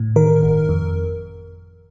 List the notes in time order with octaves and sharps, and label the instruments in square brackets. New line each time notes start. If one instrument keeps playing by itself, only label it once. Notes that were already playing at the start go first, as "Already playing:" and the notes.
Already playing: [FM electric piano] A2
D#3 A#4
G1
F2